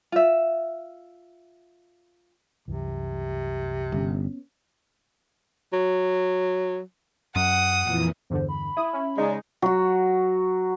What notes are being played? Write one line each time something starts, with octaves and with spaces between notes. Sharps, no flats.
F4 E5
C2 F#2 C3 E3
G1 B3 C#4
F#3
F#2 F#5 D#6
F2 A#2 E3
E2 G2 D3 C5
B5
E4 D#6
C#4
C#3 G#3 D#4 D5
F#3 F#4